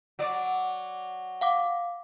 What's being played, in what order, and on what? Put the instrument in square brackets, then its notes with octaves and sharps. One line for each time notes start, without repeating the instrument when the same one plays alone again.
[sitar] F#3 D5
[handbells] F5 F#5 D6